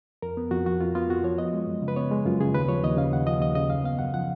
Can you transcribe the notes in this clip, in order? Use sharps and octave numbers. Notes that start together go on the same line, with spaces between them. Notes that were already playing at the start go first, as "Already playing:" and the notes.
F2 A#4
B3
F2 F#4
F3 F#4
F2 F4
B3 F4
F2 F#4
F3 C#5
B3 D#5
G#3
F#2
C#3
B4
B3 C#5
G#3
F#2 F4
C#3 G#4
D#2 B4
F3 C#5
D#2 D#5
C#3 F5
D#2 F#5
F3 D#5
D#2 D#5
C#3 D#5
F#2 F5
B3 F5
F#2 F#5
F3 F#5